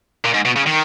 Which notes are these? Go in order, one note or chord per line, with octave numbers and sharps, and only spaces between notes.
A#2
G#2
B2
C#3
D#3